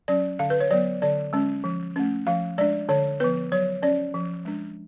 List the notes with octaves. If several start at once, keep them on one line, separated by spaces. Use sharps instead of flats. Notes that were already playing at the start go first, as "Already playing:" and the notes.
F#3 C#4 D5
D3 F5
B4
C#5
F#3 B3 D5
D3 D5
G#3 C#4
F3
A3 C#4
F3 F5
G#3 D4 D5
D3 C#5
F3 B3 B4
F#3 C#5
C#4 D5
F3
G#3 D4